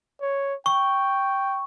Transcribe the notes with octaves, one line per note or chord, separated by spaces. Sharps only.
C#5
G5 C#6